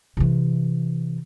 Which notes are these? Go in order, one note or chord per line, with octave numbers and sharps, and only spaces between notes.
C3 E3